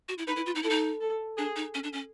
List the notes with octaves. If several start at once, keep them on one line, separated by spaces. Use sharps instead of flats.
F#4
E4
D#4 B4
E4
F4
D#4
E4 A4
D#4
A4
D4 G#4
D#4
C#4
D4
C#4